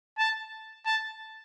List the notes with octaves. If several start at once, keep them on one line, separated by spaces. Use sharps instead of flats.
A5
A5